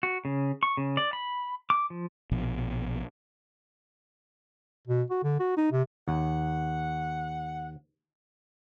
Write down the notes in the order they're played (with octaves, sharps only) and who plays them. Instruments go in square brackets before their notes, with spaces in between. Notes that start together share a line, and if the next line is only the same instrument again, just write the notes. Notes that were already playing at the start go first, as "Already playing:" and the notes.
[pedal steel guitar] F#4
C#3
C#6
C#3
D5
B5
D6
F3
[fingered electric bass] A#1 B2 F3
[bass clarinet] B2
F#4
D3
F#4
D#4
C3
[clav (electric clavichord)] D#2 [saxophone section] F#5